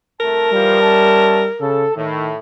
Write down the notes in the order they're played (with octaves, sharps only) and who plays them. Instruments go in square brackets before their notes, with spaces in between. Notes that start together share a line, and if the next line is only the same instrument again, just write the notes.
[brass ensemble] C2 A3 A5 [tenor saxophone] A#4
[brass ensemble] D2 E3 F3 [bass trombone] G3
[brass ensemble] C#4 E5 A5
[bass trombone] C#3 [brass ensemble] A4
[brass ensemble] A2 [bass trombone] D#3